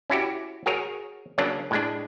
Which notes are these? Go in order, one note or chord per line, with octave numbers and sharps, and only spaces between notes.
C#4 E4 F#4 G4
F#4 G#4 A#4 C#5
C#3 F#3 A#3 C#4 D4
A2 G#3 D4